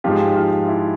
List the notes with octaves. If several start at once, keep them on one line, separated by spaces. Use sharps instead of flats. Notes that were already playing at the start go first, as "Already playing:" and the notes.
G#2 F3 G#3 F4 G4
F4
E4